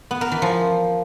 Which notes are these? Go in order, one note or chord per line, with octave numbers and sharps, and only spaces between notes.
B3
A#4
E3
F3